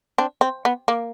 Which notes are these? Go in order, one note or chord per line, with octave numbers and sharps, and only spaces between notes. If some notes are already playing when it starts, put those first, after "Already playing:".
C4 D4
C4
B3
A#3